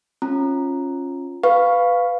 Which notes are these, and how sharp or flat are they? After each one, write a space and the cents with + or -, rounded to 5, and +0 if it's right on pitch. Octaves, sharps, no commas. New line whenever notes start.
C#4 -20 F4 +0 A#5 +0
B4 +10 F5 +0 C#6 +0